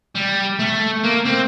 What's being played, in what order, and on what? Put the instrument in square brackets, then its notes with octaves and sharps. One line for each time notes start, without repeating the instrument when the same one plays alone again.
[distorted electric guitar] G3
A3
A#3
C4